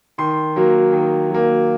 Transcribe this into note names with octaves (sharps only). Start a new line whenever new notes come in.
D#3 C6
F#3 A#3
D#3
F#3 A#3